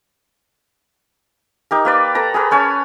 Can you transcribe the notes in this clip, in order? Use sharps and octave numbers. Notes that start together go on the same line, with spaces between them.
D#4 G4 A#4
A#3 B4 D5
A4 B4 A#5
G#4 A#4 B4
C#4 C#5 G#5 A5